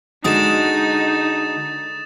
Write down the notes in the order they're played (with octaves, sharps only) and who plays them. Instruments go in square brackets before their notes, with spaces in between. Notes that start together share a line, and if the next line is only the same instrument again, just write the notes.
[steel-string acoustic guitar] D3 G#3 F#4 [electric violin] D#4 [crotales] D#6 A6 E7